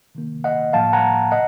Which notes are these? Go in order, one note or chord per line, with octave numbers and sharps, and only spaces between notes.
C3 D#3 A#3
D#5 F#5
A2 F3 A#3 F5 A5
F#5 A#5
C3 D#5 F#5